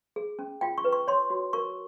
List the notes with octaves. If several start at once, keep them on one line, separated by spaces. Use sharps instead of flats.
G#4
C#4
F4 G5
C#6
B4
C#6
C#5 C6
F#4
A#4 C#6